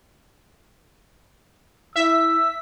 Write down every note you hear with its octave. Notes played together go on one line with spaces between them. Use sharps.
E4 E5 E6 B6